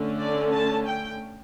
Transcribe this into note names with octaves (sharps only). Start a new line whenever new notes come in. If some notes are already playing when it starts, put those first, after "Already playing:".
Already playing: D3 A3 C#4
D5
A5
G5